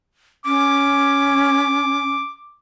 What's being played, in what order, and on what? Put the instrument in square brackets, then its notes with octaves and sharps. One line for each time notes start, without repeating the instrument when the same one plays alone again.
[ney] C#4 [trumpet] D6